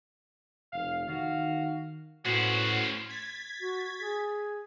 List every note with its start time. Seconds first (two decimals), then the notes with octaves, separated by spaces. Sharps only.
0.73 F1 F5
1.07 D#3 F#4 F5
2.26 A2 B3 C#4 F#4 C5
3.09 G#6 A6 B6
3.60 F#4
4.00 G#4